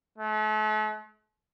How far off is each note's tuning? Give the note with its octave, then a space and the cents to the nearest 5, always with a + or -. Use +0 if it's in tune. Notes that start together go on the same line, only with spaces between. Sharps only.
A3 -40